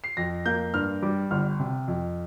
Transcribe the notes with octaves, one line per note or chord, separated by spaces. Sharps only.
C7
F2 A#6
A#3 G6
G2 F6
G3 D6
G1 F6
C3
F2